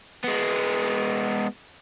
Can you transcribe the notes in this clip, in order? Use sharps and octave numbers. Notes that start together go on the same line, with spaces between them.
G#3 B3